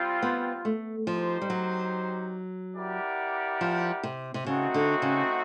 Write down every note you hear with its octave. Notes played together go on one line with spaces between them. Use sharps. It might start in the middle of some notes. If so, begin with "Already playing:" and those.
Already playing: G3 C4 F4
B3
A3
F3 D#4 G4 C5
G3
F#3
E4 G4 A#4 D5 F#5
F3
C3
C3
C#3 A3 C4 D#4 F#4
D3
C#3